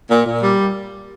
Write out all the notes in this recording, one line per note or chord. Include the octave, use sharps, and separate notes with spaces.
A#2
A#2
G3